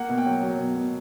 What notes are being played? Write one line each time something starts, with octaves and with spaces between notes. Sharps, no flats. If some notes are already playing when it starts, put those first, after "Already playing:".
Already playing: A#3 F#5
B2
G5
F#3
F#3
B2
B2